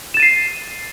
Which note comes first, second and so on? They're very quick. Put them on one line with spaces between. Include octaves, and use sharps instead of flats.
E7 A6 D#7 C7